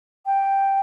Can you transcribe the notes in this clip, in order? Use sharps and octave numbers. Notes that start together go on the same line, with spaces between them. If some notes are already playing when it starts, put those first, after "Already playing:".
G5